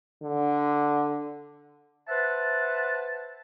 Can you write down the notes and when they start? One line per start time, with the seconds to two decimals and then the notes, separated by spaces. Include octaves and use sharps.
0.23 D3
2.08 B4 C5 E5 F#5 A5